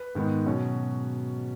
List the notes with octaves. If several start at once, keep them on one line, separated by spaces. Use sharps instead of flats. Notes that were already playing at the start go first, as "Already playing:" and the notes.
Already playing: B4
G#2 D#3 G#3 B3
B2 F#3 C#4